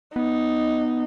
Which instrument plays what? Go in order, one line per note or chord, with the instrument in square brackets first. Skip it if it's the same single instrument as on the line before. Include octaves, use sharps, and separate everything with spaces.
[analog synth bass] B3 [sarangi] D#4